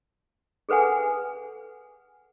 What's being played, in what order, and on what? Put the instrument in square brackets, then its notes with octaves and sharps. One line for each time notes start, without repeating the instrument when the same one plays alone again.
[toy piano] G#4 A4 B4 F#5 G#5